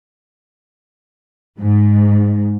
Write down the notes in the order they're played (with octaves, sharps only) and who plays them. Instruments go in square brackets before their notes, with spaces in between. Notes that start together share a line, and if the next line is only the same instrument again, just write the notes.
[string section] G#2